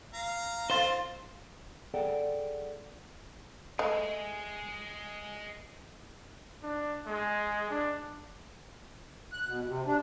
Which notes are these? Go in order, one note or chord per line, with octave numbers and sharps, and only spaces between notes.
F5 A#5
C4 F4 C5 F5 C6 A6
G#4 A4 D5 F#5 G5
G#3 A3 G#4 D#5
D4
G#3
D4
F#6
B2
C3
D4